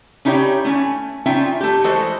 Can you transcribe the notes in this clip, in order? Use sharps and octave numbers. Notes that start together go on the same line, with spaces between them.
C#4 D#4 E4 G4 C#5 G5
A3 C#4 G#5
C#4 D#4 F4 E5 G5
A3 G4
E3 G#3 F#4 A4 C5 D#5